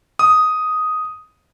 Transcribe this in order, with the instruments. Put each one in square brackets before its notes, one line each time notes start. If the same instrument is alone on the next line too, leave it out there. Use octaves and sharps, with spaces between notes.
[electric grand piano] D#6